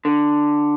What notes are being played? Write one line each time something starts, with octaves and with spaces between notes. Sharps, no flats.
D3